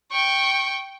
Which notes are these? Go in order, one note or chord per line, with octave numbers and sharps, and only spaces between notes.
G5 C#6